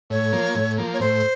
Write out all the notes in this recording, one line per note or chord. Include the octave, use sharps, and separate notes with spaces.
A2 C#5
F3 A#3
A2
F3 A#3
C#5
A2 C5